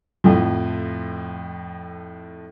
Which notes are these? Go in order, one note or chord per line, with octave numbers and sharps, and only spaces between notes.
F2 A2 F3